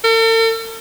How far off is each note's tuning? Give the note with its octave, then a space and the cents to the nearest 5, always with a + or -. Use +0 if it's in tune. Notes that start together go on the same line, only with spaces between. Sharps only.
A4 +45